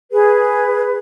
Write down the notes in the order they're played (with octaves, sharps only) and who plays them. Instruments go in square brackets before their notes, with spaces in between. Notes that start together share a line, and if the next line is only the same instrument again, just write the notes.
[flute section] G#4 B4